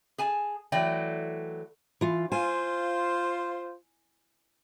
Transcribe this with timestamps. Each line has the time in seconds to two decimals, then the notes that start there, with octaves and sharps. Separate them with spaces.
0.18 G#4 G#5 A5
0.72 E3 F#3 A3 D5 G5
2.01 E3 F4
2.32 F4 C5 G#5